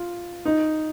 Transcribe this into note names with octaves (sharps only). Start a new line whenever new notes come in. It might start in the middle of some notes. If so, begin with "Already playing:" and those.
Already playing: F4
D#4